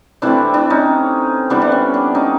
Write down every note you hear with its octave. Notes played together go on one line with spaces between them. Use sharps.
C3 E3 A3 C4 D4 E4
D4 E4
C#4 D#4
C3 E3 G3 B3 D4
D4
C#4
D4
C#4 D#4